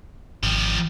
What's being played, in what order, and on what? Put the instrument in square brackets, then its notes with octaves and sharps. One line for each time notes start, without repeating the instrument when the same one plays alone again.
[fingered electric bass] G#1 [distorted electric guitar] F3 G4